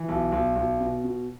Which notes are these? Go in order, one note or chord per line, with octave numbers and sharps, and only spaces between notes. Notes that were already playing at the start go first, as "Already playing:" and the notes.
Already playing: E3
B1
B1
B1
B2
B2